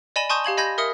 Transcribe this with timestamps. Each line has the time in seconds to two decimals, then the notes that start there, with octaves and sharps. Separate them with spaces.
0.16 D5 D#5 G#5 B5 E7 G7
0.29 G#5 A5 C6 C#6 D#6 G6
0.45 G4 F5 G#6 F#7
0.57 D#5 G#5 B5 G6 G#6 A#6
0.78 A#4 E5 D#6 C#7 G7